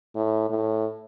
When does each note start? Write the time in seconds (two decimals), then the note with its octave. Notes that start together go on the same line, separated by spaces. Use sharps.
0.16 A2
0.50 A2